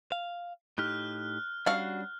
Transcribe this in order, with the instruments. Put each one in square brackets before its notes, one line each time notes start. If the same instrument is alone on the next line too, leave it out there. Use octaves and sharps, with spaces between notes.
[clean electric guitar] F5
[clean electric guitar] A2 D#4 G4 [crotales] F6 F#6
[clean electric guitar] G3 C#4 D4 [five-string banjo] F#4 F5